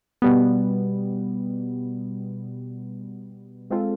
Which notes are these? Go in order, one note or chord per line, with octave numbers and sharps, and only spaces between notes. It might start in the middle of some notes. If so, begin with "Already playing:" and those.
B2 G3 B3
G#3 C4 F4 A4